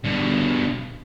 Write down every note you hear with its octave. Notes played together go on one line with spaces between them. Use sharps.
G2 B2